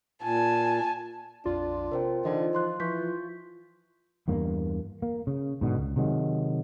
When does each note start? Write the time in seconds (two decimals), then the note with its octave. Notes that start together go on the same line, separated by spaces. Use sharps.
0.22 A#2 G#5 A5
1.46 A#1 F2 D4 F4
1.91 C3 A#4 C5 G5
2.25 D3 E3 D#4 C5 D#5
2.55 F3 C6 F#6
2.80 E3 F3 C#6 G6 B6
4.28 E2 G2 A#3
5.02 A#3
5.27 C#3
5.61 G#2 B2 D3
5.77 C#2
5.96 C3 D#3 F#3 G#3